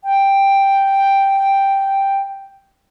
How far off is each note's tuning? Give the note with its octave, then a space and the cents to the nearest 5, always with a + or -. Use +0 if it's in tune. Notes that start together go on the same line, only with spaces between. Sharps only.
G5 +0